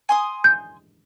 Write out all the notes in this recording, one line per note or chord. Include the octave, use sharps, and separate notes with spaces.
G#5 C6 D#6
G6